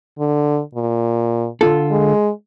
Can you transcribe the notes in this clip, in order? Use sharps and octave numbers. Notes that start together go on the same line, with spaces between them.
D3
A#2
D3 F4 A4
G#3